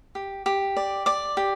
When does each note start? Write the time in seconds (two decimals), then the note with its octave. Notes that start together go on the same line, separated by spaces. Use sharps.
0.15 G4
0.46 G4
0.76 D5
1.06 D5 D6
1.37 G4